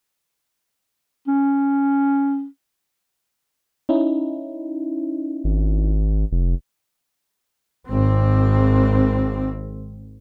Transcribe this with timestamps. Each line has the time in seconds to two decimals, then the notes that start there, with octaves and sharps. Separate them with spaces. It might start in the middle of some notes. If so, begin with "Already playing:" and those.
1.28 C#4
3.89 C#4 D#4 E4
5.44 G#1
6.32 F1
7.87 G#1 C4